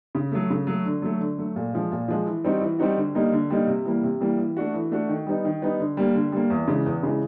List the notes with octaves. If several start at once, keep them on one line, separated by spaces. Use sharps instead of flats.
C#3
F#3 A3
C#3
F#3 A3
D3
F#3 A3
D3
F#3 A3
A#2
F3 G#3
A#2
F3 G#3
E3
G3 C4 D#4 F#4
E3
G3 C4 D#4 F#4
D3
G3 A#3 D#4
D3
G3 A#3 D#4
C3
E3 G3 A#3
C3
E3 G3 A#3
E3
A3 D4 F#4
E3
A3 D4 F#4
D#3
G3 B3 D#4
D#3
G3 B3 D#4
D3
G3 A#3
D3
G3 A#3
E2
C#3 E3 G#3
E2
C#3 E3 G#3